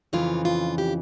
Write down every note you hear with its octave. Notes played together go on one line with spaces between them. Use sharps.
F2 C#3 E3 F4
F4
G4